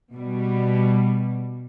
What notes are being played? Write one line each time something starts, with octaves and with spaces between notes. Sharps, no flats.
B2 G3